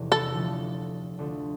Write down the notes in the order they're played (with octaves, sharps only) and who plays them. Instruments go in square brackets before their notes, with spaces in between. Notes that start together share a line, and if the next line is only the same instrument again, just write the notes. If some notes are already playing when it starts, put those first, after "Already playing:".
Already playing: [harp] F1 E2 C3
[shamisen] A4
[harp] D2 D3 F3 A3 D4
D2 D3 F3 A3 D4